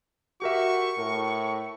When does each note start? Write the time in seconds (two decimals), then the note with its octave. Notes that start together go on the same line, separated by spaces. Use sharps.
0.42 F#4 G4 A#4 E5 C#6
0.98 A2 A#4